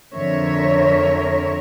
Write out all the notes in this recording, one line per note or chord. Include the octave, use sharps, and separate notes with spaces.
F2 D3 A#4 C#5 E5